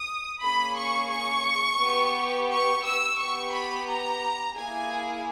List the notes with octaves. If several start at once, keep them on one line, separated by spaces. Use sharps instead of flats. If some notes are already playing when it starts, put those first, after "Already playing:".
Already playing: D#6
A#3 C#4 G#4 B5
C#6
C#6
B3 G4
C#6
E6
B3 G4 C#6
B5
A#5
A#3 E4 G#4 G#5